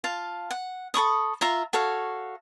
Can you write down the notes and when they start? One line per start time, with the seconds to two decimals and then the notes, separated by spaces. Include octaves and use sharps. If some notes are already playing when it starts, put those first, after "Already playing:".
0.04 F4 F5 A5
0.51 F#5
0.94 A4 B5 C#6 D#6
1.41 F4 E5 A#5
1.73 F#4 A4 C#5 F5